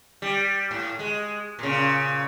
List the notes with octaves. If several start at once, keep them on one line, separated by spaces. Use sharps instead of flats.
G3
A2
G#3
A#2 C#3